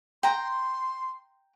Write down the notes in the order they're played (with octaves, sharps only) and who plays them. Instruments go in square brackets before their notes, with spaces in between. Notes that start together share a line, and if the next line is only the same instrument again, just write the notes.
[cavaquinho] G5 A#5 [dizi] C6